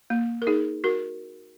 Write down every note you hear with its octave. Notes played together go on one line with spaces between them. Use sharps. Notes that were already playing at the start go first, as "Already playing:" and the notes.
A#3
A#4
D#4 G#4
F#4 A#4